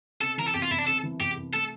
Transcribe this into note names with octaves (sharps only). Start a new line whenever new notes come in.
C3 A4
E3 A#4
A4
C2 G4
F4
C2 E4
D4
C3 A4
E3
C2 G4
C2
A3 A4